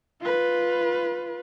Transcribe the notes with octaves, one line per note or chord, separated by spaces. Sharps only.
F4 B4